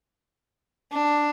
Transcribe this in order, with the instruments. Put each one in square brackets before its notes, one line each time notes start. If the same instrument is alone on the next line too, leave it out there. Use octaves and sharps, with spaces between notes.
[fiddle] D4